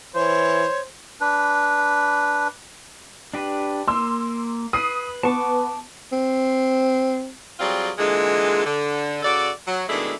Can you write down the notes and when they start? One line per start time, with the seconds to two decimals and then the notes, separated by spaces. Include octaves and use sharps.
0.15 E3 C5 C#5
1.21 D4 B4
3.34 D4 G4 B4
3.88 A#3 C6 E6
4.73 B4 D#6 C7
5.23 B3 A5 C#6 D6
6.12 C4
7.60 F#3 G3 C4 F4 G#4 D5
7.98 A#2 D3 E3 G#3
8.65 D3
9.23 C#3 F#4 A4 D5
9.66 F#3
9.88 B2 D#3 G#3 A3 D4 E4